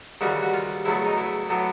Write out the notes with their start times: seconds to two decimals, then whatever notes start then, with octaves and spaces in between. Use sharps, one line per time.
0.21 D#2 C#3 E3 G3 F#4
0.42 F#4
0.53 F4
0.85 E2 C#3 F#3 A3 E4
1.06 D#4
1.17 E4
1.49 A2 F#3 B3